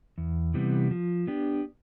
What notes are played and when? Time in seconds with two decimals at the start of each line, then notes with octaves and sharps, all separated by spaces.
0.18 E2
0.54 C3 E3 G3 B3
0.91 F3
1.27 B3 D4 G4